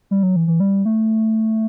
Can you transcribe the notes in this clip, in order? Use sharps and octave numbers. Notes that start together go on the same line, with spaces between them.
G3
F#3
E3
E3
G3
A3